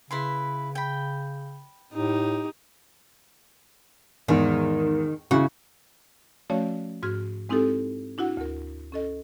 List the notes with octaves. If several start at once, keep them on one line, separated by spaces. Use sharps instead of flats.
C#3 E4 B4 C6
G5 B5
A2 D#4 G4
E2 G#2 D#3
C#3 E4 F#4
F3 A3 C#4 F#4 C#5 D5
G#2 F#4 F6 G#6
G#3 C4 D#4 E4 G4 A4
D4 E4 F#4 F#5
D2 A#4
C#4 A4 D#5